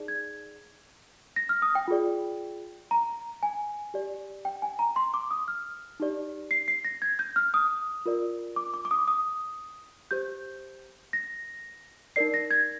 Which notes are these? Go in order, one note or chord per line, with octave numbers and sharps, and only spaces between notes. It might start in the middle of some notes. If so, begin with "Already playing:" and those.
Already playing: D#4 G#4 D5
G#6
A#6
F6
D#6
G5
F4 G#4 D5
A#5
G#5
G4 D5
G5
G#5
A#5
C6
D6
D#6
F6
D#4 G4 D5
C7
C7
A#6
G#6
G6
F6
D#6
F4 A#4 D5
D6
D6
D6
D#6
D#6
G4 C5 G6
A#6
D#4 A#4 D5 C7
A#6
G#6